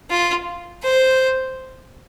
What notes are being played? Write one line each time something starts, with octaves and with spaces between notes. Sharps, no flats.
F4
C5